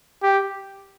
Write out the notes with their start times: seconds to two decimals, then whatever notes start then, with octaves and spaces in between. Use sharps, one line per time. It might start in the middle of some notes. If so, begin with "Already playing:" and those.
0.23 G4